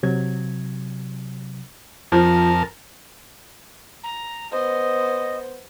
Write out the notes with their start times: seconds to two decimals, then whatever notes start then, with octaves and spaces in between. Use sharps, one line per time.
0.03 C3 F#3 G#6
2.12 F2 F3 A#4 A5
4.04 A#5
4.52 B3 C5 D#5